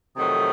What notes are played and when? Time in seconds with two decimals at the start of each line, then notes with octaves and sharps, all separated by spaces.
0.17 F2 C3 D#3 F#3 A3 D#6